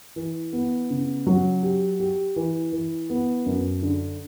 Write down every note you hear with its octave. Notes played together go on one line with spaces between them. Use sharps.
E3
B3
C#3
F#3
G4
G4
E3
E3
B3
F#2
D3